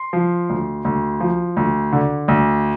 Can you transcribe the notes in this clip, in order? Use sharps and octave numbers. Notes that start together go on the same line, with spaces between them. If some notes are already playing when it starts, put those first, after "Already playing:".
Already playing: C6
F3
D2
D2
F3
D2
D3
D2